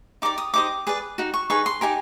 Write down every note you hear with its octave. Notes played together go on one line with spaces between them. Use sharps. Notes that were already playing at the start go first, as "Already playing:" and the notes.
D#4 G4 A#4 D5 D6
D#6
D#4 G4 C5 D#5 D6
G#4 B4 D5
D#4 F#4
C#6
D#4 G#4 B4 C#6
C6
D#4 G4 A#4 G#5